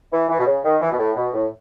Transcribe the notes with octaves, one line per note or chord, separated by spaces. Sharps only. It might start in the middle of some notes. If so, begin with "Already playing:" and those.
E3
E3
B2
C#3
D#3
E3
B2
A2
B2
A2